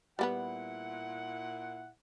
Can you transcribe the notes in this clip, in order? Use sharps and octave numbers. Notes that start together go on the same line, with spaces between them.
A#2 G3 B3 E4 B4 F#5